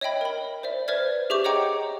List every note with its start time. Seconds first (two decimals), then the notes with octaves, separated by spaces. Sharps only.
0.01 C#5 D#5 E5 G5 B5
0.21 A#4 B5
0.63 C5 D5 E5
0.88 B4 C5 D5 E5 F6 G#6
1.30 G4 G#4 E5 C#6 D6 G6
1.44 C#5 D#5 F#5 G5 A#5 D6